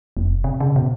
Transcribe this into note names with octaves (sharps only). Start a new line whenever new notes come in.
F1
C3
C#3
B2